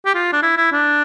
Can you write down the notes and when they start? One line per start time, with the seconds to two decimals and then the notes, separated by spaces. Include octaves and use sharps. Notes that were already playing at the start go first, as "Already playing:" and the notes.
0.05 G4
0.14 F4
0.33 D4
0.43 E4
0.57 E4
0.72 D4